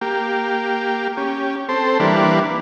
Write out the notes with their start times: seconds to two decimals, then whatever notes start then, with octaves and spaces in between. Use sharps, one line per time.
0.01 A#3 G4
1.17 C#4 G4
1.69 C4 A4 C5
2.00 E3 G3 A#3 D4 B4